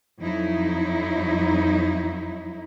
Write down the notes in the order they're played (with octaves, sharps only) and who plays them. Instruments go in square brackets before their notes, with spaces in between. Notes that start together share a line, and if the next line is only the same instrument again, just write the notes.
[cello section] F2 F#3 D#4 E4